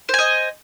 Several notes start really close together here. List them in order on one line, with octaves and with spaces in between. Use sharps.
C5 G#5 D#5